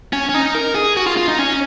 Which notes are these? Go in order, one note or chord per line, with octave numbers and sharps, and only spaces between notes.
C#4
C#4
D#4
A#4
G#4
F#4
F4
F4
D#4
C#4